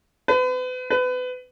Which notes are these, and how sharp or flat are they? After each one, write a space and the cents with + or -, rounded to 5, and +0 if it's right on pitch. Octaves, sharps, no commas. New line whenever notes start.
B4 +40
B4 +30